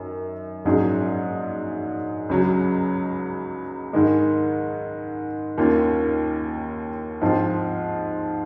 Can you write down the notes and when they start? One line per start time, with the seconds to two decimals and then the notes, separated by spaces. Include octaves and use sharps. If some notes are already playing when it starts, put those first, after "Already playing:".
Already playing: F#2 D#3
0.65 A#1 G#2 F#3 C#4 G#4
2.29 C#2 C#3 F#3
3.93 G#2 D#3 G#3
5.58 D#2 D#3 A#3 C#4 F4
7.21 G#2 F3 C4 F4